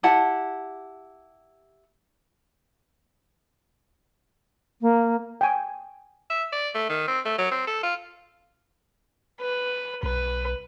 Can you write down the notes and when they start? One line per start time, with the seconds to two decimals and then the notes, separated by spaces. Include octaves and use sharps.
0.03 E4 G4 F#5 A5
4.81 A#3
5.41 G5 G#5
6.30 E5
6.52 D5
6.75 A3
6.89 D#3
7.08 C4
7.25 A3
7.38 F#3
7.51 C4
7.67 A4
7.83 F4
9.41 B4
10.03 B1 B4